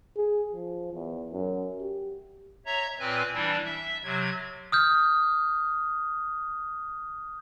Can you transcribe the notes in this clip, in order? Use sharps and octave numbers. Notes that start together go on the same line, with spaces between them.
G#4
F3
E2
F#2
G4
C#5 E5 A#5
A#2 C4 B4 G#5
E3 G3 D4 E4
E5
C3 F#3 G#6
D#6 F6 G6